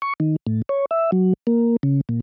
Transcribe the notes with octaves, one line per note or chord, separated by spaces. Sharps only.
C#6
D#3
A2
C#5
E5
F#3
A#3
C#3
A#2